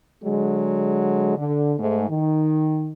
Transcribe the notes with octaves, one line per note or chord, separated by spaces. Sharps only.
D3 F#3 G#3
D3
G#2 A3
D#3